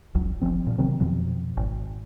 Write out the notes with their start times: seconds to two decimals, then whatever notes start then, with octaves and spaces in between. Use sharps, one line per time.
0.15 F#1 C#2 F#3
0.41 F#1 E2 F3 C4
0.67 A#2 F3
0.78 C3 D#3 F#3 C4
1.00 F2 B2 F3 F#3
1.57 G#1